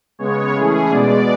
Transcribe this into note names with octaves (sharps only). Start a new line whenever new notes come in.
C#3 G#3 B3 C#5
E3 A3 C#4 G#4
B2 G#3 B3 D5